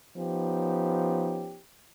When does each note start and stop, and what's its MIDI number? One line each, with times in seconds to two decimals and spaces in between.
0.17 1.58 53
0.17 1.58 59
0.17 1.58 61
0.17 1.58 63
0.17 1.58 67